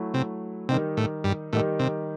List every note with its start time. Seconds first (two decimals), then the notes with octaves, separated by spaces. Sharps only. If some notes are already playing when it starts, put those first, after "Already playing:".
Already playing: F#3 A3 E4
0.14 C3
0.69 C3 D#3 G3 D#4 G4
0.97 A2
1.24 G2
1.53 A2 D#3 G3 D#4 G4
1.79 C3